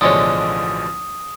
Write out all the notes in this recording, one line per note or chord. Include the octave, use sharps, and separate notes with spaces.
A1 B2 D3 F3 G#3 C#5 D#6